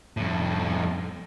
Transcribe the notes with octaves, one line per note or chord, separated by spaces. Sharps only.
F2 A2